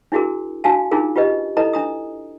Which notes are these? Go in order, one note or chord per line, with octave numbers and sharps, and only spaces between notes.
D4 E4 F#4 G#4 A#4
D4 F#4 F5 G#5 A5
D4 D#4 F4 G#4 A#4
F4 G4 B4 D#5
E4 A4 B4 D#5 A#5
D4 A#5 D#6